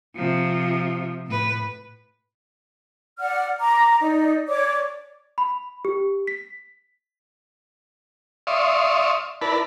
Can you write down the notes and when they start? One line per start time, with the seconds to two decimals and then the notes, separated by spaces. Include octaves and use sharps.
0.15 C3 F3
1.26 A2 B4
3.19 D5 F#5 F6
3.60 A#5 D6
4.01 D#4 D5
4.49 C#5 D5 D6
5.38 B5
5.85 G4
6.27 B6
8.47 D5 E5 F5 C6 C#6 D#6
9.41 E4 A#4 B4 D5 A5 B5